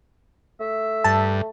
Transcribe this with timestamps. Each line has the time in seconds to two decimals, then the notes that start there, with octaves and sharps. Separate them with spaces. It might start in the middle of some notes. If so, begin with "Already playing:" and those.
0.60 A3 E5
1.04 G2 A5